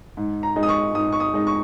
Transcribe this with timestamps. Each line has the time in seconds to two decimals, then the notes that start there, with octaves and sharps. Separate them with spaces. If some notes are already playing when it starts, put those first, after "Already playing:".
0.17 G#2
0.43 A#5
0.56 G#3 D#4
0.63 D#6
0.69 C#6
0.95 G#2 D#6
1.13 C#6
1.20 D#6
1.34 G#3 D#4
1.47 C#6